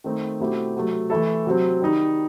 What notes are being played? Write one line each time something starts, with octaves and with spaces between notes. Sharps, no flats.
D#3 A3 C4 D#4
B2 A3 C4 E4 G4
C3 F#3 A3
E3 A3 E4 A4
C3 F#3 C4
D#3 G3 D#4